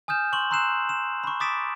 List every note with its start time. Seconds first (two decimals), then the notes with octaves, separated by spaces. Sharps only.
0.08 G#5 D#6 F6 G6 E7
0.33 C6 C#6 F#7
0.51 A#5 C6 E6 F#6 C7 E7
0.89 E7
1.24 B5 C#6
1.40 D6 D#6 A6 B6 D7 E7